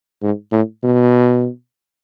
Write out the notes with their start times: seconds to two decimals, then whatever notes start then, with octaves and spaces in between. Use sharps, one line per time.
0.22 G#2
0.52 A2
0.83 B2